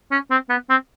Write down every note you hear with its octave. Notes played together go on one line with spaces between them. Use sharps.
C#4
C4
B3
C4